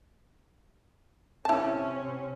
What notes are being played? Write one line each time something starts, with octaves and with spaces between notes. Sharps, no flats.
C3 C4 C#4 E4 A5